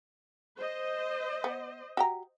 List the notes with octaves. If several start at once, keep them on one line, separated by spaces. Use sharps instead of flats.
C5 D#5
B3
F#4 G4 A#5